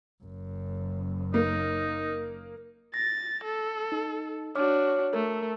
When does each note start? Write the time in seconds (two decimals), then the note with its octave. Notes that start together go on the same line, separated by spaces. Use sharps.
0.23 F#1 F#2
1.34 A#3 D#4
2.94 A6 A#6
3.44 A4
3.92 D#4
4.55 D4 F#4 C#5 D6 F6
5.13 A3 A#4